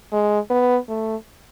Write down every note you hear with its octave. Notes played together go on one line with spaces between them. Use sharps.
G#3
B3
A3